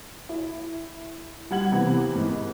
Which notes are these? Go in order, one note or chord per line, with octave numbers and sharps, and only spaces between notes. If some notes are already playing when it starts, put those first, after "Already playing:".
E4
G3 F#5 G#6 F#7
C3 E3 B3
G#1